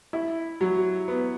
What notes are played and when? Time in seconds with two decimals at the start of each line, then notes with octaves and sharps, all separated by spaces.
0.13 E4
0.61 F#3
1.08 B3